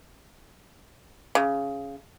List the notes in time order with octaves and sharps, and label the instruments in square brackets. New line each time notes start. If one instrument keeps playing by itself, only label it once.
[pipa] C#3